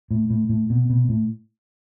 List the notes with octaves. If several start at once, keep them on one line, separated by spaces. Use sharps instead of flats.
A2
A2
A2
B2
B2
A2